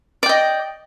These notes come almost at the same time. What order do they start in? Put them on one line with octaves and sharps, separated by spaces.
D5 G5 D#5